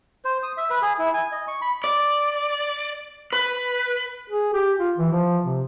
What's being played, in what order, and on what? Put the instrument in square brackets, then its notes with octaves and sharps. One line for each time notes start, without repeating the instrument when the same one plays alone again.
[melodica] C5
D#6
E5
B4
G#4
E4
G#5
D#5
C#6
B5
[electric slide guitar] D5
B4
[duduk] G#4
G4
F4
E3
F3
C3